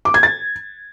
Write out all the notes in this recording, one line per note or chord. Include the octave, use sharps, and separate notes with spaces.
D6
G#6
A6